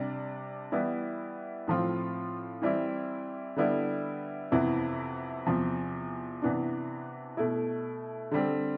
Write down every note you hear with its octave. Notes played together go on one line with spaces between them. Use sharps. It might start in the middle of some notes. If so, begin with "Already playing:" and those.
Already playing: C3 G3 D4
E3 G3 B3 E4
A2 F3 C4 F4
E3 G3 C4 E4
D3 G3 B3 E4
F2 C3 E3 B3 E4
E2 C3 F3
C3 E3 B3 D4
B2 A3 E4
D3 G3 C4